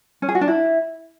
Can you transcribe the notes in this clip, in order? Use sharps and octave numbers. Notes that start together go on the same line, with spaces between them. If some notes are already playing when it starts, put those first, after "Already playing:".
C#4
G#4
F#4
D4
E4